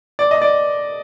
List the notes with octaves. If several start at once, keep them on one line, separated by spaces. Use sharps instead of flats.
D5
D#5
D5